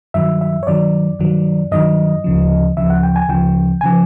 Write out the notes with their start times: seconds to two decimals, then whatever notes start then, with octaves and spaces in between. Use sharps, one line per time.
0.14 G2 D#3 F#3 E5
0.41 E5
0.63 C#5
0.67 G2 D#3 F#3 D5
1.19 G2 D#3 F#3
1.72 G2 D#3 F#3 D#5
2.24 D2 C#3 F3
2.77 D2 C#3 F3 E5
2.90 F#5
3.03 G5
3.16 G#5
3.29 D2 C#3 F3 G5
3.81 C#3 F3 G#5